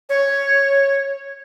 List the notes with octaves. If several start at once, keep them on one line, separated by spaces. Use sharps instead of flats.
C#5